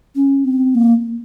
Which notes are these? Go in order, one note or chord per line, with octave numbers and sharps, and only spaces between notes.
C#4
C4
A#3